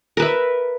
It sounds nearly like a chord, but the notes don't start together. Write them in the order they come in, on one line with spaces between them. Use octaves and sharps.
A#4 B4 E5